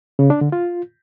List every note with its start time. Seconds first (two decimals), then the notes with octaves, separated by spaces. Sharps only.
0.19 C#3
0.30 D4
0.41 D3
0.52 F4